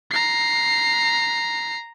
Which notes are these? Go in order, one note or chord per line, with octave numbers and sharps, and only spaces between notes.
A#5 C7